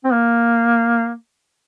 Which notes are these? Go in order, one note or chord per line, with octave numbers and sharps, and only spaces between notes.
C4
A#3